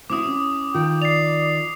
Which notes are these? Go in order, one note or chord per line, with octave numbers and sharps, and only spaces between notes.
C4 E4 F#4 D6 D#6
C#4
D#3 F4 G5
D5 C7 F7